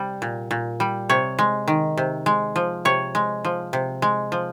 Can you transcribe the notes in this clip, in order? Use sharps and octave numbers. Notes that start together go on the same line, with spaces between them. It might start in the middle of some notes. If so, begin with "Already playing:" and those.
Already playing: C3 G3
A#2
A#2
G3
C3 C#5
G#3
D#3
C3
G#3
F3
C3 C#5
G#3
F3
C3
G#3
F3